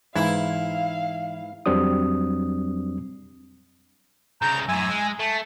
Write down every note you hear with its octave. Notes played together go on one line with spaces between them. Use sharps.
G#2 E3 E4 F5
F2 F#3 G3 C4 D4 D#6
C2 C#3 A#5 G6
F#2 A2 G#5 E6
G#3
A3 A5